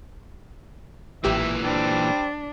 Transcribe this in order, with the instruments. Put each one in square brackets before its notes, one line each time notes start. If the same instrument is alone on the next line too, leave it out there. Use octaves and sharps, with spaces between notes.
[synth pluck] A1 G4 E7 [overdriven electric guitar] A#2 E3 [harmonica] E5
[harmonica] G3 C4 [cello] D4